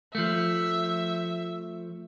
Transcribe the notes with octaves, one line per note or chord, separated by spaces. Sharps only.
F3 A3 E5